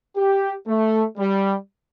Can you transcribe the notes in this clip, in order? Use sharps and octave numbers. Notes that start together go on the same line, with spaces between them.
G4
A3
G3